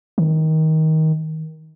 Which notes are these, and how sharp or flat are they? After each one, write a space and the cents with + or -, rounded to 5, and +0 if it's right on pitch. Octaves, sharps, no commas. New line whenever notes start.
D#3 +20